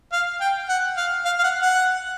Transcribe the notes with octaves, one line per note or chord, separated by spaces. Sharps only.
F5
G5
F#5
F5
F5
F5
F#5
F#5